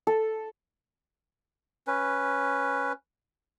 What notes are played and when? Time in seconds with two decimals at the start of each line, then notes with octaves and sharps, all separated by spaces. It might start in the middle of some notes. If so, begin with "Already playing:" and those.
0.07 A4
1.87 C#4 B4